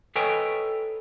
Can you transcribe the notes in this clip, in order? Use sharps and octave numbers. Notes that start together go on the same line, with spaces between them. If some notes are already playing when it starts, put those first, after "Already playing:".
A4 B4 C#5 D#5 G5 G#5